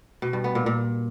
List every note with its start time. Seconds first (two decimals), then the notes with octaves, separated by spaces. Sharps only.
0.22 B2
0.33 G2
0.44 B3
0.55 A#2
0.66 A#2